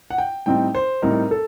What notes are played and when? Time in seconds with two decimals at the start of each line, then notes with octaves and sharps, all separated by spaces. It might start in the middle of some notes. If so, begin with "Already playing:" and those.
0.10 F#5
0.18 G5
0.46 A2 G3 C4 D#4 G5
0.75 C5
1.02 A2 G3 C4 D#4 A#4
1.31 A4